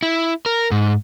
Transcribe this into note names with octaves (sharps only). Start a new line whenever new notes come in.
E4
A#4
G#2